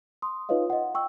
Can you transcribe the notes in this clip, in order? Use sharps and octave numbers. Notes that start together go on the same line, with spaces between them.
C6 D#6
D#4 F4 B4 C#5 D#5 F5
D#5 F#5
G5 C#6 E6